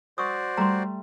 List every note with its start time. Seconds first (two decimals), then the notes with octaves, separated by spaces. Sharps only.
0.18 F#4 C5 D5 C#6 D#6 A6
0.58 G3 A3 A#5 C6